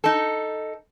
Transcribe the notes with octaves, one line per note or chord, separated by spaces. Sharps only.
D#4 A4